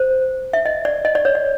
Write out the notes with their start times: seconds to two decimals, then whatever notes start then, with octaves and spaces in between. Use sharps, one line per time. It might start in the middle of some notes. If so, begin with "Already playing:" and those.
Already playing: C5
0.53 E5
0.66 D#5
0.85 D5
1.05 D#5
1.15 D5
1.25 C#5
1.35 D5